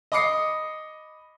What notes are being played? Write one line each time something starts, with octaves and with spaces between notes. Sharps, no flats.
D#5 B5 D6 D#6 C7 C#7